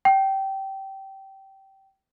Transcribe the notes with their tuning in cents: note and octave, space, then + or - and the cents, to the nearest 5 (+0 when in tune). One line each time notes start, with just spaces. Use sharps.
G5 -20